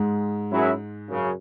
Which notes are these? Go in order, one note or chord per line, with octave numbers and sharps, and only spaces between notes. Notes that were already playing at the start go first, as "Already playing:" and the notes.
Already playing: G#2 G#3
F#2 F#3 E4 G#4
F#2 C#3